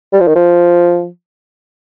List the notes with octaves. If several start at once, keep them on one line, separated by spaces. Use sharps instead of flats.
G3
F3
D#3
F3